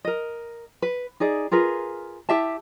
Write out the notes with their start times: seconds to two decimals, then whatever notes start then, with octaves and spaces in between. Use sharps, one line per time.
0.05 A#4 D#5
0.82 B4
1.20 D#4 G#4 D5
1.51 F4 G#4 A#4 B4
2.29 E4 G4 E5 A5